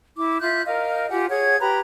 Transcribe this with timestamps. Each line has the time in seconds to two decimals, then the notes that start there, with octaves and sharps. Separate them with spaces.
0.17 E4 D6
0.42 F4 E5 F#6 G6
0.65 A#4 D#5 F5
1.10 F4 G4 F#5 G#5
1.30 G#4 C#5 F#5 G#6
1.60 G4 B4 A#5 B5